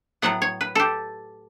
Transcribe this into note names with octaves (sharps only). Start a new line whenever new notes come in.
A2 F#3 B3 F#5
C#5
B4
G4 A4